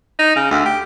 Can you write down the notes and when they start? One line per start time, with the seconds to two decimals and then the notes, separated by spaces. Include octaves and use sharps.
0.19 D#4
0.36 C#3
0.51 D2
0.66 G4